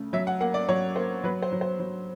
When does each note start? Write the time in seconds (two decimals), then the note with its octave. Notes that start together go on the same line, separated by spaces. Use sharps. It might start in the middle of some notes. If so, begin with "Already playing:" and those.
Already playing: C#3 A3
0.13 F#3 E5
0.27 F#5
0.41 A#3 F#5
0.54 D5
0.69 F#3 C#5
0.96 A#3 C5
1.24 F#3 B4
1.42 C5
1.52 F#3
1.61 C5
1.80 F#3